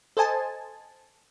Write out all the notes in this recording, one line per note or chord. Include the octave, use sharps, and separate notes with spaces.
A4 C5 D#5 G#5 A5